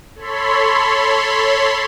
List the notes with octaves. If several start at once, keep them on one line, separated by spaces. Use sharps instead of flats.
A4 C#5 B5 C6